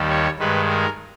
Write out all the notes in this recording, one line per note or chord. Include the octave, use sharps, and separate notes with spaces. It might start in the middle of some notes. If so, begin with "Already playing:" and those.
Already playing: D#2 D#3 G3
C#5
G2 D#3 G#3 B4
A#4